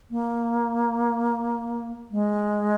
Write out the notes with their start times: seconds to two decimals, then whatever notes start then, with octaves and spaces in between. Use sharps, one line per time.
0.11 A#3
2.11 G#3